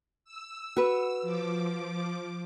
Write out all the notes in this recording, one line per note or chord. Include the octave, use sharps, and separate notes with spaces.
E6
F#4 B4
F3 D6